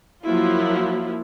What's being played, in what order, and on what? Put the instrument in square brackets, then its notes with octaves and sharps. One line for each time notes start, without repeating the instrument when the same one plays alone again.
[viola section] F3 F#3 A#3 E4 F4